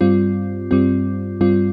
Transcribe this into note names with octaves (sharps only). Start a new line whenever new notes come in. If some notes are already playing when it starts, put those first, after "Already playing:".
G2 G3 C4 F4
G2 G3 C4 F4
G2 G3 C4 F4